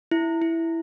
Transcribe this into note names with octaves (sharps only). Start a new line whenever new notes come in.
E4
E4